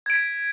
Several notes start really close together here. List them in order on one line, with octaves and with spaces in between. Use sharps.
G#6 D7 B6